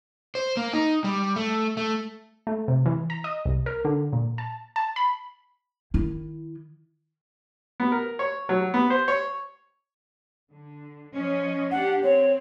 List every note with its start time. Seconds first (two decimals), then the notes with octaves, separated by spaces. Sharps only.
0.35 C5
0.57 A#3
0.73 D#4
1.04 G3
1.36 A3
1.77 A3
2.47 A3
2.68 C3
2.86 E3
3.10 A#5
3.24 D#5
3.46 C2
3.66 A#4
3.85 D3
4.13 A#2
4.38 A5
4.76 A5
4.96 B5
5.94 D#3 E4
7.80 B3
7.92 A#4
8.19 C#5
8.49 F#3
8.74 B3
8.90 C5
9.08 C#5
10.52 D3
11.12 F3 C#4 D#5
11.71 D4 G4 F#5
12.03 C4 C#5